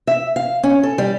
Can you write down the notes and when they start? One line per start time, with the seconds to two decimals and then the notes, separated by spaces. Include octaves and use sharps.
0.07 E5
0.36 F5
0.63 C#4
0.83 A4
0.98 G3